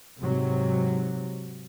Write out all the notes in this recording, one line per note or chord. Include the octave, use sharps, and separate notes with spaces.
G#2 C3 F#3